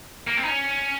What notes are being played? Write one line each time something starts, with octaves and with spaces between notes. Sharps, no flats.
A#3
C4
D#4
C#4